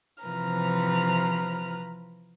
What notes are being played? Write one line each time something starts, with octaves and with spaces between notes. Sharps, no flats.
C3 E3 F3 B4 A#5 F6